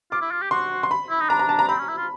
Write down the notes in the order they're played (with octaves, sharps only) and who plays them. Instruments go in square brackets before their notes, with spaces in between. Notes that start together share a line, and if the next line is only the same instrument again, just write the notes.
[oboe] F4 [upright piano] D6
[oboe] E4
F4
G4
[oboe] F#4 [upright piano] C6
[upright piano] C6
B5
[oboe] E4
D#4
[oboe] D4 [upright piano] A#5
[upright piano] A#5
A5
A#5
[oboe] C4 [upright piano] B5
[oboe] C#4
E4
F4